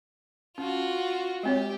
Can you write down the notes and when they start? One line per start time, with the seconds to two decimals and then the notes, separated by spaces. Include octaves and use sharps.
0.58 C#4 F4 F#4
1.43 G#3 C4 G4 C#5